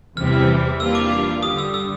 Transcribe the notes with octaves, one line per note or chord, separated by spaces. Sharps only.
E2 C3 E3 G3 C4 F6
E3 G3 A#3 D4 F4 E6
D6
G2 D3 G3 D#6
E6
E6